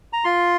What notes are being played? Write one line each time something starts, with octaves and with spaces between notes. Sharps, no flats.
A#5
F4 C6